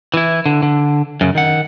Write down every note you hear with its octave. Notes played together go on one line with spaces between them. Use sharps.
E3 E4
D3
D3
F#2 C#3
D#3 F#5